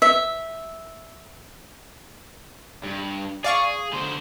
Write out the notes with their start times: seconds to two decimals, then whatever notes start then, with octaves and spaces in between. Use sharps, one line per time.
0.02 E5
2.83 G2
3.44 G#4 D5 F5 C#6
3.93 D3 C5